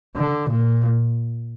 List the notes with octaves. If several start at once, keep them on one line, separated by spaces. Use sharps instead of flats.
D3
A#2